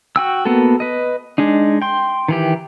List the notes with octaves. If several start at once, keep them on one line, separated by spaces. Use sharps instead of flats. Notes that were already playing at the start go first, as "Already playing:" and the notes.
F#4 G5 E6
A#3 B3 F#4 A4
B4 D#5
G#3 D4 D#4
G5 C6
D#3 E3 G4